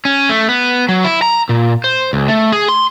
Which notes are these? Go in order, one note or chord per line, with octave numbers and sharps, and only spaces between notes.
C#4
A3
B3
F#3
E4
A#5
A#2
C5
C#2
A3
G#4
C6